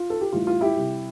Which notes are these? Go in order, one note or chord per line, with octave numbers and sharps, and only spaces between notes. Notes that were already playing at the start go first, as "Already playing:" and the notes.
Already playing: F4
A4
G4
A2 E3 G3 F4
F4
E4 G4
C3 G3